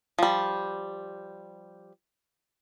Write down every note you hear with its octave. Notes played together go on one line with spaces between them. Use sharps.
F3 G3